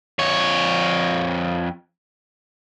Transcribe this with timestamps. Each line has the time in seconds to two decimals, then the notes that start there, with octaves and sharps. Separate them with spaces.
0.19 F2 C#5